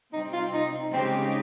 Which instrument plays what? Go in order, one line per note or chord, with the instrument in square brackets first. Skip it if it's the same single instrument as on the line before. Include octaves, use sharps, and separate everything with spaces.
[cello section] C3 G3 C4 [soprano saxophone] D#4
[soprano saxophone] F4
D#4
[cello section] C#3 G#3 D#4 G4 [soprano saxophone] C4